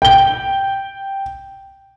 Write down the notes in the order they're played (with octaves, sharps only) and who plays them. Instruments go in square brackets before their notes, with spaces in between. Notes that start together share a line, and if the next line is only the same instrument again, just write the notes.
[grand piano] G5 G7